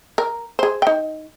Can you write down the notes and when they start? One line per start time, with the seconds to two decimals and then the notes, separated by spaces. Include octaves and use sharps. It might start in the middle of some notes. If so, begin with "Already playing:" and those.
0.18 A#4
0.59 G#4 C5
0.82 D#4 G5